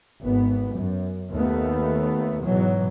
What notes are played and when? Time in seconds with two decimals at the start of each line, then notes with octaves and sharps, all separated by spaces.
0.22 G#1 B3
0.76 F#2
1.32 D#2 A3 B3
2.44 G#2 B2 E3 F#3